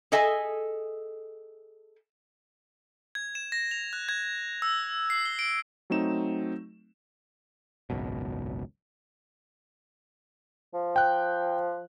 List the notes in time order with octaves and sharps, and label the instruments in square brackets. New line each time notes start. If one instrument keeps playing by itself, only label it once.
[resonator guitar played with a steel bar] G#4 A4 D#5 E5 G#5
[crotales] G#6
E7
A#6
F7
F#6
G#6
E6
C7
G7
D7
[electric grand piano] F#3 A3 C4 D#4 E7
[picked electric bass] G#1 C#2 F#2 B2
[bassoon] F3
[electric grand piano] G5 F#6